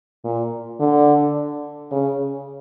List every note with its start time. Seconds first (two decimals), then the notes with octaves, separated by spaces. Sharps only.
0.25 A#2
0.80 D3
1.92 C#3